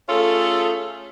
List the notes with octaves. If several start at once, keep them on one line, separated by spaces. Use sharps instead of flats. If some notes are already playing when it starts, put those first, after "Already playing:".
A3 C#4 F4 G#4 A4